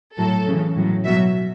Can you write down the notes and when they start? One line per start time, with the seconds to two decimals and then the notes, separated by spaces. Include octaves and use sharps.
0.17 A2 F#3 A4
0.47 C#3 E3
0.76 A2 F#3
1.05 B2 F#3 E5